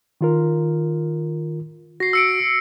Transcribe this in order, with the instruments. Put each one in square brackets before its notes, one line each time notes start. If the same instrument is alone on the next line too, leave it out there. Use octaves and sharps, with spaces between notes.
[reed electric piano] D#3 F4 A#4
[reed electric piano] F#4 [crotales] A#6 C7
[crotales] E6 C#7 D7